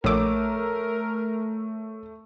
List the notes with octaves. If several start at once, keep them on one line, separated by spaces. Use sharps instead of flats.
A#1 A3 A#4 C#5 D6 E6